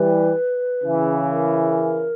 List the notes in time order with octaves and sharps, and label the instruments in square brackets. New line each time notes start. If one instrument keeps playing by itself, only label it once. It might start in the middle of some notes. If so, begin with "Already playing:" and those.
Already playing: [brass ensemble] E3 G3 [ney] B4
[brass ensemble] C#3 E3
[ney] A#4